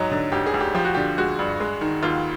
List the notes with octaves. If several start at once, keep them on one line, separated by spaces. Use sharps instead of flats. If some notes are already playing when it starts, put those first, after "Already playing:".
Already playing: G#2 F#3 D#4
D3
D2 G4
G#4
D2
G4
F3 G4
F#4
D3 G4
G#3 F#4
G2
G#3
D#3
D#2 F4